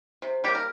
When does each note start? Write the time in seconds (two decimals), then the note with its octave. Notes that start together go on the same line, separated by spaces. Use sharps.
0.22 C3
0.44 G3 A#3 G4
0.55 A#4